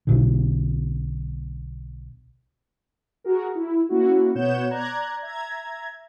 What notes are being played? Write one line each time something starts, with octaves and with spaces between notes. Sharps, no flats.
B1 B2 D3
F#4 G#4 A#4
E4
A#3 C#4 E4 F#4
B2 B3 C#5 F#5 G6 E7
D5 A#5 F#6 G#6
E5 A#5 G#6